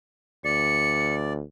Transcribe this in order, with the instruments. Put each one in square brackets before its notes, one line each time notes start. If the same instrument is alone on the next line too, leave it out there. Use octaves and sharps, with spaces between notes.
[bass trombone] D2 [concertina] D5 [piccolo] C#7